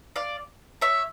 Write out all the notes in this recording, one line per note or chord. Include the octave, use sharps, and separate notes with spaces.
D5 F5
C#5 E5